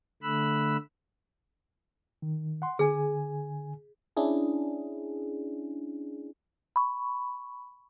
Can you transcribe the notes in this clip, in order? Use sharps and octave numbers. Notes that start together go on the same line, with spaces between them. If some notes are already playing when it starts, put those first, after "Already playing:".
D3 A3 B5 E6 F#6
D#3
F#5 C6
D3 G#4 G#5
C#4 D4 E4 G#4
B5 C#6